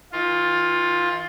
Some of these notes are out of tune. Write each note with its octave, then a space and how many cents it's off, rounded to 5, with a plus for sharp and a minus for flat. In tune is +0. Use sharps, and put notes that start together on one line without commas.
E3 -45 F4 +10